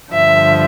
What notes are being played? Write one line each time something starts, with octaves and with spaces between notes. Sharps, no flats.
G2 D3 F3 E5